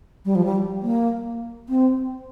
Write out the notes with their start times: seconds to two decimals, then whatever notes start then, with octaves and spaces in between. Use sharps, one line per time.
0.25 G3
0.35 F3
0.45 G3
0.82 A#3
1.69 C4